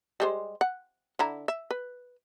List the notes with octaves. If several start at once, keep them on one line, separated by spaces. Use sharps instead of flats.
G3 G#3 C5
F#5
D3 E4 A#5
E5
B4